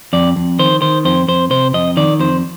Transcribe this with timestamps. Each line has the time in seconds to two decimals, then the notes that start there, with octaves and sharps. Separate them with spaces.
0.13 F2 D5
0.36 F2
0.59 D#3 C5
0.82 D#3 C5
1.05 F2 C5
1.28 F2 C5
1.50 C3 C5
1.74 F2 D#5
1.97 D#3 D5
2.20 F2 C5